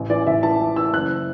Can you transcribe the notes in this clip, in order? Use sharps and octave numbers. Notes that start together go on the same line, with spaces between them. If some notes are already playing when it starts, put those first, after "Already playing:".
Already playing: A1
E3 D5
A1 E5
E3 A5
E3
E3 E6
F#1 F#6